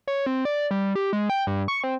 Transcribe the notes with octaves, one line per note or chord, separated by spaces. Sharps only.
C#5
C4
D5
G3
G3
G4
G#3
G5
G2
C#6
C4